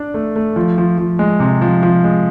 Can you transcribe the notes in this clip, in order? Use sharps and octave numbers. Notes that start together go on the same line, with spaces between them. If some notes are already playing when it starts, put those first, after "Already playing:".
Already playing: D4 D5
A3
A3
F3
F3
F3
G#3
C3
F3
F3
G#3